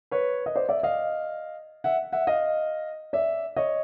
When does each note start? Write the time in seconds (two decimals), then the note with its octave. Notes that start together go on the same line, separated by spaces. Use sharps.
0.11 B4 C#5
0.46 D#5
0.56 C5 D5
0.69 D5 E5
0.83 D#5 F5
1.84 E5 F#5
2.13 E5 F#5
2.27 D#5 F5
3.13 D5 E5
3.56 C#5 D#5